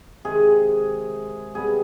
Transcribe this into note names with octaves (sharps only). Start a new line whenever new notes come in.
C3 D#3 G#3 G#4
C3 G3 B3 G#4